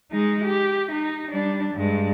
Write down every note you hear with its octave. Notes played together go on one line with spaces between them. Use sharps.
G#3 D#4
G4
D#4
G3 D4
G2 G#3